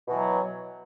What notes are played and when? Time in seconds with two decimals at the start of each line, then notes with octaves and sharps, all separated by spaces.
0.07 B2
0.10 E3
0.13 F#3